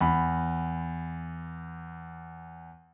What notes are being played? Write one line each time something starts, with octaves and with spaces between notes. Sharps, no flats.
E2 B5